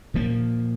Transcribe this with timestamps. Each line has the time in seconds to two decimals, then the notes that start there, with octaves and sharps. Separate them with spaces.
0.14 A#2 F3 A#3